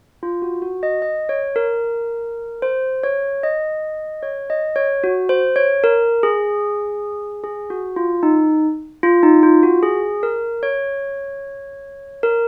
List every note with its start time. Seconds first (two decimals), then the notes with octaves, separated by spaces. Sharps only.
0.23 F4
0.42 F#4
0.62 F#4
0.83 D#5
1.02 D#5
1.29 C#5
1.56 A#4
2.62 C5
3.03 C#5
3.43 D#5
4.22 C#5
4.50 D#5
4.76 C#5
5.04 F#4
5.29 C5
5.56 C#5
5.84 A#4
6.23 G#4
7.44 G#4
7.70 F#4
7.96 F4
8.23 D#4
9.03 F4
9.23 D#4
9.43 F4
9.63 F#4
9.83 G#4
10.23 A#4
10.63 C#5
12.23 A#4